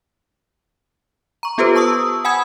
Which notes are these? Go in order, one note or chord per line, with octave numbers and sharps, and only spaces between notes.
A#5 C#6
B3 F4 G4 A4 B4 C5
A5 C#6 D#6 E6
F#5 G#5 B5 D#6 G#6